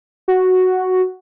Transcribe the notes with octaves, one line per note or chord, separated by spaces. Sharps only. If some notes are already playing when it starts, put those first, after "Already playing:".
F#4